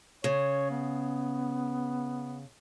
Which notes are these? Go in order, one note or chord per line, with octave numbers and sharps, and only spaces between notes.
C#3 C#5
B3